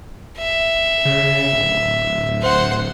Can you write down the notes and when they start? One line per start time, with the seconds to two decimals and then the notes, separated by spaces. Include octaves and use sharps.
0.38 E5
1.05 C#3
1.52 D1
2.42 C5 F#5